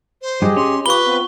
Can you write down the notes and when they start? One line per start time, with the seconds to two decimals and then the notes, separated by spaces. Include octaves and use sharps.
0.22 C5
0.42 G2 F#3 G4 G#4 D#5
0.57 C#4 C6
0.86 F4 G4 B4 B5 C#6 G7
1.04 B3 C4 F4